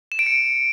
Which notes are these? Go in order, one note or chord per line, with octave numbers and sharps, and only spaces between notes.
E7
D7
C#7